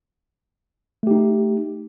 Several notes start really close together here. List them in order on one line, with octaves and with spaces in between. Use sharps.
A3 G4 D#4